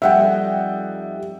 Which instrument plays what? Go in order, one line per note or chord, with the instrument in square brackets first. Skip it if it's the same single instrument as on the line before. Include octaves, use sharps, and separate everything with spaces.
[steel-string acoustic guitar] F2 G3 D#4 [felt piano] E5 F#5 G5